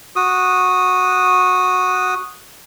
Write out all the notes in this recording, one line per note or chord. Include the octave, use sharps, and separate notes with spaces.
F#4 D#6